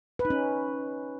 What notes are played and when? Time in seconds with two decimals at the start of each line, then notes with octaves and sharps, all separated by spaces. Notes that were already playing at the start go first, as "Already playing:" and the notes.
0.19 B4
0.25 D#4
0.30 C#4